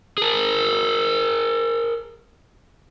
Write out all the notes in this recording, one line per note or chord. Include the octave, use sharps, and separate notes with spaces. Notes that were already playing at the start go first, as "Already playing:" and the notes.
G#4 A#4